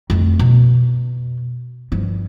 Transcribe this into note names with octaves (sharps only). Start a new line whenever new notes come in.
F2 A3
B2
G2 F3